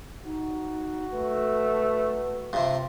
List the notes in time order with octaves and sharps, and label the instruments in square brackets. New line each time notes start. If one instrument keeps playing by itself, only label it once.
[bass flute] D#4 [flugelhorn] F#4
[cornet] A3 [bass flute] B4
[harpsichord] G2 C3 [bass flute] F4